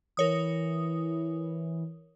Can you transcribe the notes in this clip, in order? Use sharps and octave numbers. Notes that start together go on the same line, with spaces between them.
E3 A#4 C#5 D#6